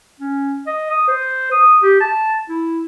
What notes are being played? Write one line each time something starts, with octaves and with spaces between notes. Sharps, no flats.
C#4
D#5
D#6
C5
D#6
G4
A5
E4